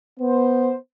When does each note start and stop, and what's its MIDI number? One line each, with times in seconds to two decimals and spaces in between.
0.20 0.77 59
0.20 0.77 72